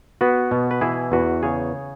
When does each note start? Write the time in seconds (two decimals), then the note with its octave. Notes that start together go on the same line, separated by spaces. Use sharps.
0.21 B3 F#4 B4
0.51 B2
0.71 B4
0.81 E3 E4 G#4
1.12 E2 F#4 B4
1.43 C#3 G#4 C#5